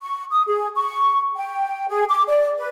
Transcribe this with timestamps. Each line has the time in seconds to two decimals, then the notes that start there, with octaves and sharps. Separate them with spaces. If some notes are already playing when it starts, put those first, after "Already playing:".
0.02 C#6
0.32 D#6
0.48 G#4
0.76 C#6
1.36 G5
1.88 G#4
2.09 D6
2.27 D5
2.58 B4